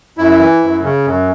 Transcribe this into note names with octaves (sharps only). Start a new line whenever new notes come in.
F#2 E4
E3
F#2
C#3
F#2